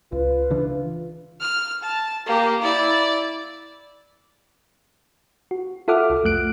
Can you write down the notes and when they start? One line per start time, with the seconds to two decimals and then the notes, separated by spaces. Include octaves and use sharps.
0.12 C#2 F4 B4
0.50 C#3 E3 D4
1.41 F6
1.83 A5
2.26 A#3 G4
2.62 E4 D5
5.51 F#4
5.88 F4 A4 E5 F#5 D6 F6
6.10 C2
6.24 F2 A3 F#6 D7